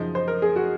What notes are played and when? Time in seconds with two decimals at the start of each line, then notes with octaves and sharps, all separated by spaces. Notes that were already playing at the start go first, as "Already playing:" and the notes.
Already playing: F#2 C#3 F3 D#4
0.15 C5
0.28 A#4
0.42 G#4
0.56 F#4